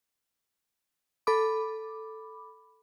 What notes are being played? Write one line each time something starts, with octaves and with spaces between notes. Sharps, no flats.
A4 B5 D6